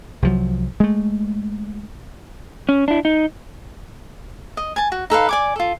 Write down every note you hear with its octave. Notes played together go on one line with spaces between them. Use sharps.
C2 F3 F#3
G#3 A3
C#4
D4 E4
D#4
D#5
G#5 A5
F#4
D#4 A4 B4 F5
D5 G#5 D6
F4 A4